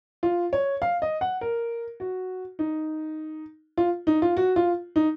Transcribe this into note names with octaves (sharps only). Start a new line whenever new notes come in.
F4
C#5
F5
D#5
F#5
A#4
F#4
D#4
F4
D#4
F4
F#4
F4
D#4